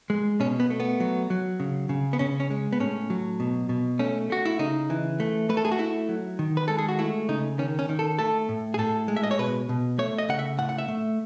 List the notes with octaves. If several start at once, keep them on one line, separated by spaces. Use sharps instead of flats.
G#3
B2 C#4
B3
A3
B3
F#3
F#3
C#3
C#3
B3
C#3 C#4
C#4
G#3
B3
A2 C#4
F#3
B2
B2
A3 C#4
A3 F#4
E4
C#3 D#4
E3
A3
A3 B4
A4
G#4
F#4
A3 E4
F#3
D#3
B4
G#3 A4
G#4
F#4
A3 E4
C#3 D#4
D#3 C#4
C#4
D#3
A4
A3 A4
A2
G#4
A2 A4
G#3
E5
D#5
C#5
B2 B4
B2
A3 C#5
D#5
C#3 F#5
E5
A2 F#5
F#5
E5
A3